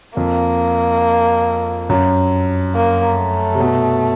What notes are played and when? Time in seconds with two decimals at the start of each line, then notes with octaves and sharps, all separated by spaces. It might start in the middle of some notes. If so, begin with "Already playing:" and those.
0.17 F2 A#3
1.90 F#2
2.75 A#3
3.18 A3
3.55 C3
3.60 B2